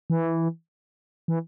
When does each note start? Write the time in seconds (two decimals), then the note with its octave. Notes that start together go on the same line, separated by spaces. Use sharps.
0.10 E3
1.28 E3